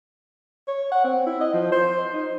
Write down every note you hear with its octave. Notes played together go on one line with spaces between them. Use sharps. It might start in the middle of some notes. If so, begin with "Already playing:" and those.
C#5
F#5
C4
E4
D#5
F3
C5
D#4